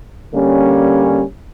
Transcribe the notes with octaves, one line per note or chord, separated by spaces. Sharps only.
D3 G3 A#3 C#4